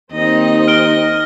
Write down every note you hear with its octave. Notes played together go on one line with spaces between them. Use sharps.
D#2 C4 D#4 D#5
F6 D7 G7